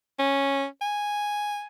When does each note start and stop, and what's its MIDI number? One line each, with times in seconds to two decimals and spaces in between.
0.19 0.66 61
0.82 1.67 80